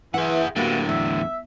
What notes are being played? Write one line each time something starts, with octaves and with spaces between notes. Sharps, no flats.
E3 E4 G#4 F#5
A2 D3 A#3 B3 E4 F#4 G4
E2 E5